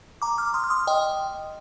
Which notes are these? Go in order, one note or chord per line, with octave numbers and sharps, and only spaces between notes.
A#5 D6
D6 F6
C6 D#6
F6
C6 D#6
D#5 G5